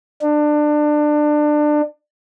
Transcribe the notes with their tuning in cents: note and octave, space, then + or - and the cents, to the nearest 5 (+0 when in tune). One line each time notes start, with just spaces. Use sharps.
D4 +25